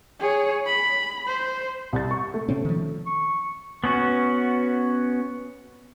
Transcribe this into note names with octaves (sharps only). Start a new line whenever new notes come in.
G#4 C#5
B5
C5
C2 A6
C#6
A3
C3 C4 C#4
D#3 F3
C#6
B3 C#4 F#4